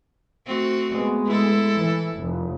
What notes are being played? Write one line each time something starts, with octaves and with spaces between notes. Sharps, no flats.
A3 C4 F#4
G#3 B3
E4 A4
E3
F1